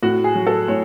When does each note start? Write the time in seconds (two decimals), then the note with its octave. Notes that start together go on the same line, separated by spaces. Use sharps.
0.02 A2 F#4
0.24 G#4
0.35 F#3
0.47 A4
0.68 A2 C#5